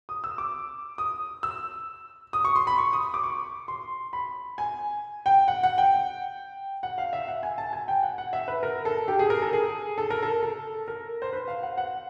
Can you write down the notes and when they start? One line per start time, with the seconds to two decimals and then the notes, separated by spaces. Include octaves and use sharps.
0.09 D#6
0.24 E6
0.38 D6
0.98 D#6
1.43 E6
2.33 D#6
2.45 C#6
2.56 C6
2.67 B5
2.78 C#6
2.93 D#6
3.14 D6
3.23 C#6
3.68 C6
4.13 B5
4.58 G#5
5.26 G5
5.48 F#5
5.63 F#5
5.78 G5
6.83 F#5
6.98 F5
7.13 E5
7.28 F#5
7.43 G#5
7.58 A5
7.73 G#5
7.88 G5
8.03 F#5
8.18 F#5
8.33 E5
8.48 B4
8.63 A#4
8.85 A4
9.08 G4
9.19 G#4
9.30 A#4
9.42 A4
9.53 G#4
9.98 A4
10.10 A#4
10.23 A4
10.43 A4
10.88 A#4
11.22 C5
11.33 B4
11.48 F5
11.63 F#5
11.78 F#5